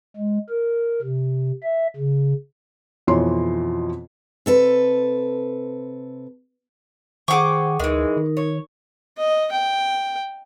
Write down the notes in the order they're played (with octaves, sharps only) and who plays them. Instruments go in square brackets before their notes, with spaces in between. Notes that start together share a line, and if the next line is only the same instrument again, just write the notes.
[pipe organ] G#3
A#4
C3
E5
C#3
[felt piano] F2 B2 E3 C#5 C6
[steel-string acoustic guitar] C3 A4 B4
[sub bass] D#3 [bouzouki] G#4 F#5 G5 [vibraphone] C5 [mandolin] C#6 D6
[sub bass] D2 [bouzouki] E3 G#3 [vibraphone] D#4 A#4
[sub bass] D#3
[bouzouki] C#5
[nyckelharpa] D#5
G5